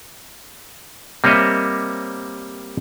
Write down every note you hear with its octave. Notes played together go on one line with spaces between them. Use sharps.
G3 A#3 C4 C#5 D#5 E5